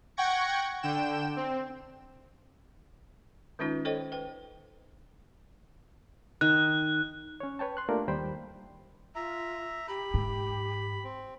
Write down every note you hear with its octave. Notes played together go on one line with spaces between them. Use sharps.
F#5 G5 C#6 G#6 A#6 C#7
D3 G5 E7
C4
D#3 G#3 C#4 D#4 F4 B4
A4 C5 C#5 D#5 G5
B4 G5
D#3 F#6
C#4 C#5
B4 C#5 G5 A5
C6 F#6
A3 A#3 D4 F4 G4 A#4
D#2 G3 C5 G5 B5
F4 E5 A#5
G4 B5
G#2
C4